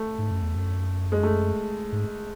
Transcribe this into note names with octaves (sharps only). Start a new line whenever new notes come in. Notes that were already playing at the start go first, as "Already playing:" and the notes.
Already playing: A3
G#2
F#2
E2
F#2
G#3
A3
G#2